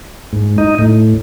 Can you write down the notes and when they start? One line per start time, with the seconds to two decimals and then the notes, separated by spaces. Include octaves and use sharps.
0.33 G#2
0.58 D#4
0.79 A2